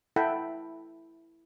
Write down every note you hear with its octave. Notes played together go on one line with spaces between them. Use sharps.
E4 A4 E5 F#5 G5 B5